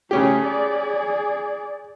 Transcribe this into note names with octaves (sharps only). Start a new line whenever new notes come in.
C#3 A3 C#4 G4 G#4
G#4 D5